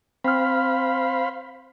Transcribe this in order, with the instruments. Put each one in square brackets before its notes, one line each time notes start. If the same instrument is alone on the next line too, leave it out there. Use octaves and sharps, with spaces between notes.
[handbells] C4 F6 [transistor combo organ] C5 F5 B5